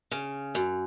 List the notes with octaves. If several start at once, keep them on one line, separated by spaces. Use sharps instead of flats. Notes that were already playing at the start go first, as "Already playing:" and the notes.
C#3
F#2